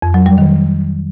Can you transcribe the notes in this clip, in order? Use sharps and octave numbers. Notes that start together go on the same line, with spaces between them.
F2
F#3
G3
D#3